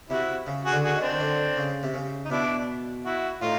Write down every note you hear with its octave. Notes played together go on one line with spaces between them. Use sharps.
C3 E4 F#4
C#3
F#4 G#4
D3
F#4 G#4
D#3
C4 D4
D#3
D3
C#3
C3
C#3
D#4
B2 D4 E4
E4 F#4
A2 D#4 F4